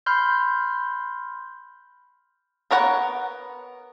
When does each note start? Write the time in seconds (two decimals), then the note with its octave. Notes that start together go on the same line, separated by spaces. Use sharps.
0.06 B5 C6 F6 G6
2.71 B3 A#4 C#5 F#5